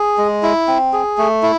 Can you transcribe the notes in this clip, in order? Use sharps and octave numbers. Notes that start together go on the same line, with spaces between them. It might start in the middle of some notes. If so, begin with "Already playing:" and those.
Already playing: G#4
G#3
E4
C4
G#4
A3
E4